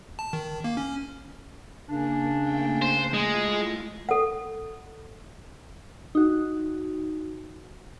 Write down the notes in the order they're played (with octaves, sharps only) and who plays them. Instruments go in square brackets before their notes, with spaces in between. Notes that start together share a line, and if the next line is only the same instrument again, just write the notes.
[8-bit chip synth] A5
D#3
A#3
C#4
[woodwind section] C#3 C#4 D4 [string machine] A#3
[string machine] A3 A#3 G5
[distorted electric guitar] C5
[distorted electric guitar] G#3 [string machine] A3 E4 F4
[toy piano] A4 F#5
[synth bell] D#4 F#4